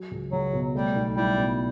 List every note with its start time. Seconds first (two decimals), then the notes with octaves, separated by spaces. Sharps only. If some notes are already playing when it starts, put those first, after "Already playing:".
Already playing: F#3
0.11 C#2
0.32 C#2 F#3
0.53 B2
0.74 G3 A3
0.95 B1
1.17 G3 E4
1.38 B2